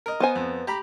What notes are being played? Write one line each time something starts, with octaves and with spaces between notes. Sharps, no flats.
A#4 D#5
B3 C5 G#5
F2
G4 A#5 B5